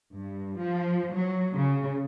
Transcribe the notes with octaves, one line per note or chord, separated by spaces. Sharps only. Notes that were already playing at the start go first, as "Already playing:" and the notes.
G2
F3
F#3
C#3